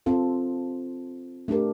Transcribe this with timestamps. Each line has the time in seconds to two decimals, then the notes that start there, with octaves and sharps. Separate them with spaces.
0.06 C4 F4 A4
1.48 A3 D4 G4 A#4